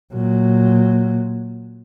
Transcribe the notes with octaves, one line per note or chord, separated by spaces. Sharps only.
A#2 F#3